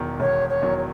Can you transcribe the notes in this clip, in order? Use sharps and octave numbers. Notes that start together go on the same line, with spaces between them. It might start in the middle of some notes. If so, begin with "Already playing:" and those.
Already playing: E1 E2 D#3 F#3
E1 C#5
C#5
E2 D#3 F#3
C#5